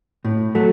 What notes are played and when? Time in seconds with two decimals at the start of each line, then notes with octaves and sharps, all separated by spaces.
0.25 A2
0.55 F#3 A3